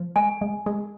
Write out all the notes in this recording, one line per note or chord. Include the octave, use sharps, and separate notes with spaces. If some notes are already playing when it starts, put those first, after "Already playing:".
Already playing: F3
G#3 G#5
G#3
G#3